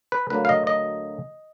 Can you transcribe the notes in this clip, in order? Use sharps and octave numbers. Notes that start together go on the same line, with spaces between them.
B4
D2 D3 F#3 A#3 B4
F5
D#5
D#5